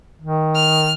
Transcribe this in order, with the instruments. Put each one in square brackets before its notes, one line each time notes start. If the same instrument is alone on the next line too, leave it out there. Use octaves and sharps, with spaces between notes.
[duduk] D#3
[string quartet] F6